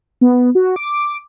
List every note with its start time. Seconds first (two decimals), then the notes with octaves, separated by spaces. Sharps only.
0.21 B3
0.55 F#4
0.76 D6